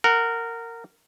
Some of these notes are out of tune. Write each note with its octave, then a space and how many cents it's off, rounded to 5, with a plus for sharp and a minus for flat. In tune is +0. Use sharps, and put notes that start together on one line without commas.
A#4 -15 F#5 +0